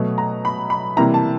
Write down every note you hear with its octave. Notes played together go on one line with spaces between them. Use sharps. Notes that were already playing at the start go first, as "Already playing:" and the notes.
Already playing: B2 F#3 A3
A#5
B5
B5
C3 E3 G3 A#3 A#5
A5